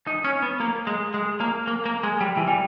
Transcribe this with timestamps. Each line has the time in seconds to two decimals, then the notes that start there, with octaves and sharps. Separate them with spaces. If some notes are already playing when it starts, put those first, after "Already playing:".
0.07 D#4
0.24 C#4
0.42 B3
0.60 A#3
0.87 G#3
1.14 G#3
1.40 A#3
1.67 A#3
1.85 A#3
2.03 G#3
2.21 G3
2.37 E3
2.48 G3